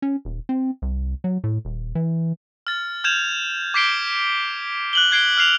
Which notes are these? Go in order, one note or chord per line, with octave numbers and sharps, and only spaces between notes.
C#4
D#1
C4
C2
F#3
A2
D#1
E3
F6 A6
F6 G6 G#6 E7 F7
D6 G6 B6 C7 D7 G7
F#6 F#7 G7
F#6 G#6 C7 D7 G7
F6 F#6 C7 F7